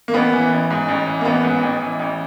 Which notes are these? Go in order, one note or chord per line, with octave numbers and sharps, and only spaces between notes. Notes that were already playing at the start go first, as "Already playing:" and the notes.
A#3
A1 B3
E3
A1
G#2
A1
E3
A#3
A1 B3
G#2
A1
E3
A1